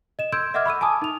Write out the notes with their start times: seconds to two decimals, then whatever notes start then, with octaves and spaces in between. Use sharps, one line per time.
0.19 D#5 E7
0.32 C6 E6 G6 G#6 D7
0.54 D#5 E5 F#5 D6 F6 G#6
0.66 B5 C#6 E6 D#7
0.81 G#5 A5 D6 D#6
1.02 D#4 F7